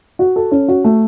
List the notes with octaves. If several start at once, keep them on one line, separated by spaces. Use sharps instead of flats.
F#4
A4
C#4
F#4
A3